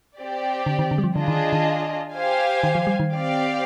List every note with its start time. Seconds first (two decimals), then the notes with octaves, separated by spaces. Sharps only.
0.18 C4 G4 D5
0.66 D3
0.79 D#3
0.91 D3
0.98 G3
1.04 F3
1.16 D3 D4 F4 G#4 D#5
1.28 D#3
1.53 D#3
2.14 G4 C5 F5 G#5
2.63 D#3
2.75 F3
2.87 G3
3.00 D#3
3.12 C4 G4 D5 F5